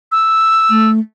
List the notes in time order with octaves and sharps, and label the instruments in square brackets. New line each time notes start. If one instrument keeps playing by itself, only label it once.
[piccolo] E6
[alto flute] A3